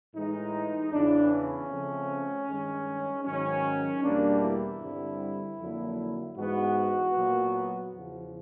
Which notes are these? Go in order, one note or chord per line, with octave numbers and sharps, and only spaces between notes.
A2 E3 G#3 D#4
E2 C#3 E3 D4
C#4
C#3 F3 A3 C4
G2 D#3 G#3
G#2 D#3 F#3 C#4
E2 B2 G3 A#3 D4
E4
G2 D3 G3 C4
F2 D3 F#3 A#3
G#2 E3 G#3 B3 F#4
A#2 F#3 B3
E2 C#3 F3